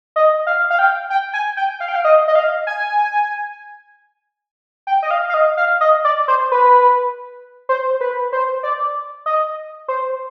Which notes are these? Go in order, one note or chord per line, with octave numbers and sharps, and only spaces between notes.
D#5
F5
F5
G5
G5
G#5
G5
F5
G5
F5
D#5
D#5
F5
G#5
G5
D#5
F5
F5
D#5
F5
D#5
D5
C5
B4
C5
B4
C5
D5
D#5
C5